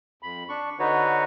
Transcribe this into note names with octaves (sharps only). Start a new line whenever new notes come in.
F2 B5
D4 C#6
D3 D#4 F#4 B4 C#5